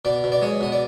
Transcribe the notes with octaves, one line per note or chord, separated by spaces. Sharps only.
B2 D5
B2
D5
G#3 C#5
B2 D#5
D5